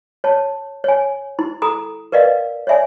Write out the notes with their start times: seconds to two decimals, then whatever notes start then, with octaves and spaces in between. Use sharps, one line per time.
0.24 C#5 A5
0.84 C#5 G#5
1.39 E4
1.62 A4 A#5 D#6
2.12 A#4 B4 D5 D#5 F5
2.67 C#5 D5 E5 G#5